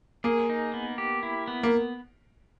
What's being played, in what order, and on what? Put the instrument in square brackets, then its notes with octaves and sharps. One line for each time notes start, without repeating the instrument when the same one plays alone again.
[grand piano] A#3 [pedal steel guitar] G#4
[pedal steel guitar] D#4
B3
G4
E4
B3
[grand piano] A#3